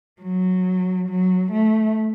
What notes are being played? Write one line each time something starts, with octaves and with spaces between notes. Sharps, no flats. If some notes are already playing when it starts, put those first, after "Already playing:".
F#3
F#3
A3